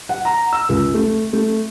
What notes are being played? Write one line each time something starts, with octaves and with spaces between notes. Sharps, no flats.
F#5
A#5
E6
C#2
A3
A3